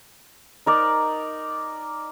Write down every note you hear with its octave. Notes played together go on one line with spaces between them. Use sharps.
D#4 A#4 D5